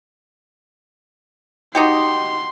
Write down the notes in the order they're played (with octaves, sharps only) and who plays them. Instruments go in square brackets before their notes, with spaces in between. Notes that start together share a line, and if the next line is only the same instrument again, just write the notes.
[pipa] D#4 F#4 G4 [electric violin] C6